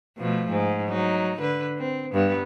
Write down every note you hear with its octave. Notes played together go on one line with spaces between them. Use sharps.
B2 F3 A3
G#2
F#3 D#4
D3 B4
C4
G2 B3